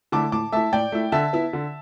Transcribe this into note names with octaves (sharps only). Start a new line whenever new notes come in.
D3 A3 E4 A5 D6
A2 A5 D6
A3 E4 E5 A5
A2 D5 G5
A3 E4
D3 E5 A5
B3 E4
D3